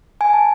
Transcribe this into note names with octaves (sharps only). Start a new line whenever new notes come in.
G#5
A5